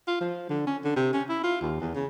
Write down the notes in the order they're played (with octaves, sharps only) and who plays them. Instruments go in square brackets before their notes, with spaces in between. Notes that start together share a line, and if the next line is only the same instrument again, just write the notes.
[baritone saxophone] F4
F3
D3
C#4
D3
C3
C#4
E4
F4
D#2
E2
C#3